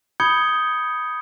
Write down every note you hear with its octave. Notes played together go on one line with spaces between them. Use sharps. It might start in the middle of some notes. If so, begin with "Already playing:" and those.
B5 D#6 G6 G#6 C#7 G7